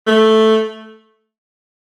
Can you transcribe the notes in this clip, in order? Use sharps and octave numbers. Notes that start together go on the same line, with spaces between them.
A3